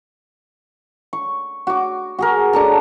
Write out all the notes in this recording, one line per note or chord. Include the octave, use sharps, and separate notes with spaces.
C#6
F#4 D6
F#4 G#4 A#4
D4 A4 A#5